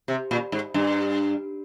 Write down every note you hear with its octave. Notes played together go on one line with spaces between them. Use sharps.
C3
A#2
G#2
G2